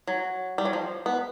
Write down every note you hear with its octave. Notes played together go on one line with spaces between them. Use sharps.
F#3
G3
F#3
F3
B3